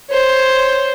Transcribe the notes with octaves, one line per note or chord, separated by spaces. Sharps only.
C5 C#5